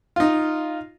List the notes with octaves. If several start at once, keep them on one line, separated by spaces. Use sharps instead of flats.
D#4 F4